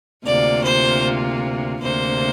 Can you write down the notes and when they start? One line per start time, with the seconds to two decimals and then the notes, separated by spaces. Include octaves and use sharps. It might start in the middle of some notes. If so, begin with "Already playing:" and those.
0.24 D2 C3 A#3 F4 D5
0.63 C5
1.81 D2 C3 A#3 C5